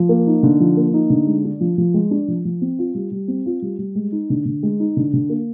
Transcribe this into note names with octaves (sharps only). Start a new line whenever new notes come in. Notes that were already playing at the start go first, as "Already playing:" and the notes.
Already playing: F3
A#3
D#4
D3
F3
A#3
D#4
D3
G#3
D4
F3
F3
G#3
D4
F3
F3
C4
F4
G3
G3
C4
F4
G3
G3
G#3
D#4
D3
D3
G#3
D#4
D3
D3
A#3